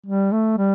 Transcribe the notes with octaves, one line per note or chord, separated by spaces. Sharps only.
G3
A3
G3